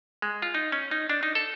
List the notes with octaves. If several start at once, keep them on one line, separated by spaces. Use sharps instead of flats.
G#3
F4
D#4
C#4
D#4
D4
D#4
A4